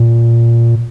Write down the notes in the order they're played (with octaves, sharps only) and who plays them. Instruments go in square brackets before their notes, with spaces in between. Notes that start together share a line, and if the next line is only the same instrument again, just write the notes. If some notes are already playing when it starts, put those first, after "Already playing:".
Already playing: [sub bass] A#2